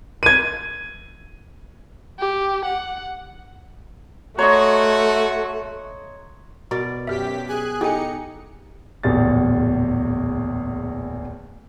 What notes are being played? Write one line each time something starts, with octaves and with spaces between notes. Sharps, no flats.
G#6 D#7
G4
F#5
A3 F#4 C#5 D#5 A#5 C6
B2 A#4 D5
F#2 G4 E5 F6 B6
G#4 G#5 F#6
D#4 E4 G4 A4 G#5 C#7
D1 A#1 E2 G4 A6